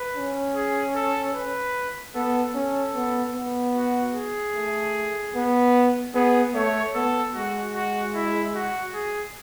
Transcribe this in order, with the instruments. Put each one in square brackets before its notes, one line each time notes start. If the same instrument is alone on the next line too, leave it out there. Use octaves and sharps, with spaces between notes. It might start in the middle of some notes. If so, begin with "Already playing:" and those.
Already playing: [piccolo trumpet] B4
[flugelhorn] C#4
[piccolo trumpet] G#4
A4
B4
[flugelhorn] B3 [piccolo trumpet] A4
[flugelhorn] C#4 [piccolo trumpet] A4
[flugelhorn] B3
B3
[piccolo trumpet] F#4
G#4
[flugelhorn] A3
B3
[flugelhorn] B3 [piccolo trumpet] G#4
[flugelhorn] A3 [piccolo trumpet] C#5
[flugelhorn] B3 [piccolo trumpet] A4
[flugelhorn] G#3 [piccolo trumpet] F#4
[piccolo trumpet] F#4
E4
F#4
G#4